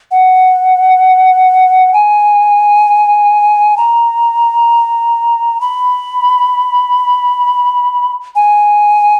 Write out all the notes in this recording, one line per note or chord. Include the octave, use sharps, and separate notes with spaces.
F#5
G#5
A#5
B5
G#5